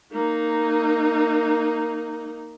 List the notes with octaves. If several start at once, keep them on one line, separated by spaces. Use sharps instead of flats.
A#3 D#4